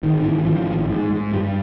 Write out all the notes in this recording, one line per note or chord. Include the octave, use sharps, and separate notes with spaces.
G#1 D#3
D#3
G#1 E3
E3
G#1 F3
A1
G#2
G#2
G2 G3